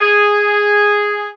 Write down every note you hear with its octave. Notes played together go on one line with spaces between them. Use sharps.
G#4